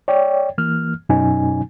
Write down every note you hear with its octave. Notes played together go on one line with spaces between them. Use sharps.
C#5 D5 G5
E3 A#3 F6
F#2 B2 F#3 C#4 D#4 G#5